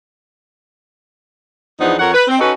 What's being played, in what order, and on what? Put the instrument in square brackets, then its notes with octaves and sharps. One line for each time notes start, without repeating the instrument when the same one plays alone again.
[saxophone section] E2 F3 B3 D4 D#4
F2 A#4 C#5 F#5
B4
C4
C#4 D#4 F#4 A4 B4